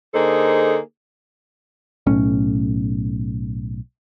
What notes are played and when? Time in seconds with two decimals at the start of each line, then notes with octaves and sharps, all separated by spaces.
0.14 D3 A#3 D#4 G#4 A4 C5
2.07 B1 A2 C#4